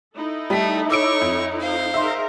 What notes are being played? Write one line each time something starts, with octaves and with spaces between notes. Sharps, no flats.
D#4 E4 A4
G3 A3 B6
C#5 C#6 D6 E6 D7
F2
C5 F5
D#4 G#4 A#4 E5 C6